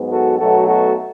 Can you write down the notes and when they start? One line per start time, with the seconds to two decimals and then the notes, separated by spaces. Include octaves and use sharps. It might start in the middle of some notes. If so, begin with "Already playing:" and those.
Already playing: G#2 F#3 B3
0.11 F#4 A4
0.39 B1 B2 F#3 A3 F#4 A4
0.66 F#4 A4